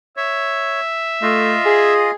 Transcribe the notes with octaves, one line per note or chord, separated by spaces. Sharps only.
C#5 E5
A3 F4 D#5 F5
G#4